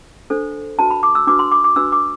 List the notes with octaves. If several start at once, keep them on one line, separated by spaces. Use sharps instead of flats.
D4 A4 C5
D4 F#4 B4 A5
B5
D6
E6
D4 F#4 B4 D6
C6
D6
D6
D4 F#4 B4 E6
D6